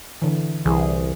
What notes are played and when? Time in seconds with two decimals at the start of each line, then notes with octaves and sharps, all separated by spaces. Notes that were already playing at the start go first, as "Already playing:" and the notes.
0.22 D3 E3
0.65 C2 E3 G#4